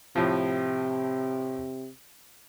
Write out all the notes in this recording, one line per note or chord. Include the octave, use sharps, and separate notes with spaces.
A2 C3 F3